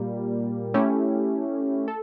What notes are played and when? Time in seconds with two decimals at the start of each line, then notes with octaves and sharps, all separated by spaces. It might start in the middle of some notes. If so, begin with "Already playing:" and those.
Already playing: A#2 G3 A#3
0.74 A3 C#4 E4 G4
1.88 A4